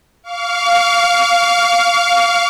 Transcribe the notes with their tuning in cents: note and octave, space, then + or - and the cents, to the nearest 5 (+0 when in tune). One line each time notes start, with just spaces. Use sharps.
F5 +0 C#6 +45